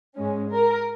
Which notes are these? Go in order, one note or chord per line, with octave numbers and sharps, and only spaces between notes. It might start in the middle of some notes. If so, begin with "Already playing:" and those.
G#2 G#3 C#4
A#4